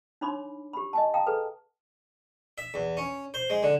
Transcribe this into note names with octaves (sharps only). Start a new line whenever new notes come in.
D4 D#4 C#5 B5 C6 D6
G4 B5
D#5 G#5 A5
F5 G5 A5 A#5 D#6
G#4 A4 B4
E5
E2
C#4
C5
G#3
D3